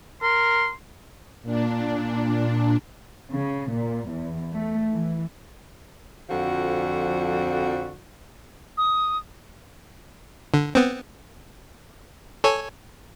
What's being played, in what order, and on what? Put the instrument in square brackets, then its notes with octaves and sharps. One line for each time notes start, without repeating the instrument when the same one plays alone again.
[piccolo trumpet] A#4 [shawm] C6
[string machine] A#2 D4
[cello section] C#3
A#2
E2
A3
E3
[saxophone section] F2 D3 F3 F#4
[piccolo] D#6
[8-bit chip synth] D3
B3 C4
A4 C#5 G#5